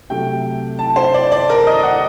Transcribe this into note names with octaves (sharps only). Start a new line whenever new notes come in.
C3 F#3 A3 G5
A5
C5
D5
D5
A#4
D#5
F#5